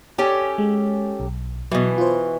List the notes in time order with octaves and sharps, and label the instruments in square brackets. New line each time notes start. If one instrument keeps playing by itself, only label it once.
[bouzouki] C#4 G4 A4
[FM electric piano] G#3
B1
[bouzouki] B2 E3 [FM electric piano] F#3
[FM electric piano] F4 C5